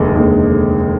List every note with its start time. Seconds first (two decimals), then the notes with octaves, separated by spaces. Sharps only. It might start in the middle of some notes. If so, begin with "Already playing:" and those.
Already playing: F1 D#2 D3 G#3
0.15 F1 D#2 D3 G#3